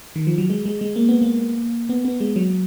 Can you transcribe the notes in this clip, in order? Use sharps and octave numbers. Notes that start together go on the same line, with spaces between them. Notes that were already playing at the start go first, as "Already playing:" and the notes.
D#3
F3
F#3
G#3
G#3
G#3
A#3
B3
A#3
B3
B3
G#3
F#3